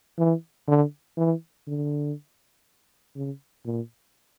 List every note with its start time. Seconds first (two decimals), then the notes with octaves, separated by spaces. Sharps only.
0.18 E3
0.68 D3
1.17 E3
1.67 D3
3.16 C#3
3.65 A#2